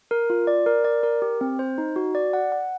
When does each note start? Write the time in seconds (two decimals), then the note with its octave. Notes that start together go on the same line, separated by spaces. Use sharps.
0.11 A#4
0.30 F4
0.47 D5
0.66 A#4
0.85 D5
1.03 A#4
1.22 G4
1.41 C4
1.59 C5
1.78 D#4
1.96 F#4
2.15 D5
2.33 F#5
2.52 F#5